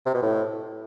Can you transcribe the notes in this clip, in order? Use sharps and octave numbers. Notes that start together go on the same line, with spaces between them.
C3
B2
A2